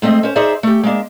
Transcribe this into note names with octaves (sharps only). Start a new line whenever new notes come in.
G#3 A3 C4 D#5
C#4 C5
D#4 G#4 C5 D5 E5
A3 G4
G#3 A#3 D4